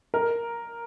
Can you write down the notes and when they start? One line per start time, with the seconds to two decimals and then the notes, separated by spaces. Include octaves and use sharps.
0.14 A#4